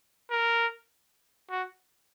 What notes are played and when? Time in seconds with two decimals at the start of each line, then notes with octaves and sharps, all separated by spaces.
0.31 A#4
1.50 F#4